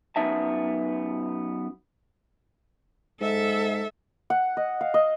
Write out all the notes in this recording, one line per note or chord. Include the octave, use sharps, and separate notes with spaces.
F#2 B3 C#4 D#4 E5 A5
G#2 A4 E5
F#5
D#5
F5
D#5